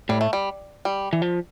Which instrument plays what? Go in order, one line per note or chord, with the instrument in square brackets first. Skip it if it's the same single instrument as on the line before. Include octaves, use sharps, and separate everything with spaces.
[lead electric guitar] A2 [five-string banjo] G3
[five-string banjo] A3
G3
G3
[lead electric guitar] E3
F3